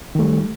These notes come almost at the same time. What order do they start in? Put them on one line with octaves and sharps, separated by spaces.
D#3 A3 G3